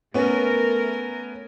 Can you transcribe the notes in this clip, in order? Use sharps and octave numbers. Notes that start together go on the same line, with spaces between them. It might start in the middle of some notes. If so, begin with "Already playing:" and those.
A3 B3 C#4 A#4